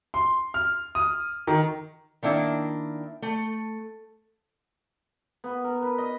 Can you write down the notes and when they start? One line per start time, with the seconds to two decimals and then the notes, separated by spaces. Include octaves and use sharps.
0.14 C6
0.54 F6
0.95 D#6
1.47 D#3
2.23 D#3 A#3 D4 E4
3.22 A3
5.44 B3
5.64 A#4
5.82 B4
5.98 D#5